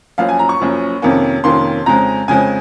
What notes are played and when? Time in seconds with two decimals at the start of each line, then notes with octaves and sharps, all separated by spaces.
0.18 F#1 F#2 F3 F5
0.29 G#5
0.39 A#5
0.49 C#6
0.60 F#1 F#2 F3
1.02 F2 C3 D#3 A#3 C#4
1.44 F2 C3 D#3 A#3 C#4 C6
1.86 F2 C#3 G#3 C4 A#5
2.28 F2 C#3 G#3 C4 G#5